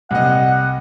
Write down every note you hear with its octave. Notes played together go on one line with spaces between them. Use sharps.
C2 D#5 F#5